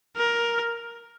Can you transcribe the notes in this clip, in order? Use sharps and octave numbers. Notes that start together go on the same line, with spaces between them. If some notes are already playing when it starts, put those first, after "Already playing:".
A#4